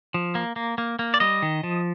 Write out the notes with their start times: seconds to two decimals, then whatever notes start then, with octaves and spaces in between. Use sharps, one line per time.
0.14 F3
0.35 A#3
0.56 A#3
0.78 A#3
0.99 A#3
1.14 D5
1.20 G3 D#5
1.42 D#3
1.63 F3